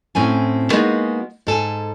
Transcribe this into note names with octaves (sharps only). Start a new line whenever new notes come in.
A2 C4 C#4 G#5
G#3 A#3 B3 D#4 F#4 G#4
G#2 A4 G#5